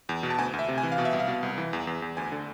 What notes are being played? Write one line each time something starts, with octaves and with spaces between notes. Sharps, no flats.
E2
B2
A5
D2 G#5
D2
E5
C3
G#5
E3
F5
B2
E5
C2
F5
B2
C2
E3
E2
E2
E2
D2 G#5
D3